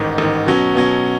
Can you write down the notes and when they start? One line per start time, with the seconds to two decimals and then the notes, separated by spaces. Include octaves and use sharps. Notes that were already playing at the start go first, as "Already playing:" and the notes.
Already playing: A1 G#2 D#3
0.18 A1 G#2 D#3
0.46 B2 F#3 C#4
0.75 B2 F#3 C#4